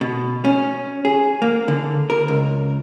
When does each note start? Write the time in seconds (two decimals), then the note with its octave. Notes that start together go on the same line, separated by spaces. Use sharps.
0.01 B2
0.45 C#4
1.05 G#4
1.42 A#3
1.68 D3
2.10 A#4
2.28 C#2